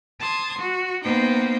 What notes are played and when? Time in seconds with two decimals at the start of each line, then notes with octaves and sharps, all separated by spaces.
0.20 A5 C6 D#6 G#6
0.60 F#4
1.04 A#3 B3 D#4 C5 G5